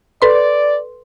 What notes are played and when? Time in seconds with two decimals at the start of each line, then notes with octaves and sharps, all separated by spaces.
0.22 A4 B4 D5 C6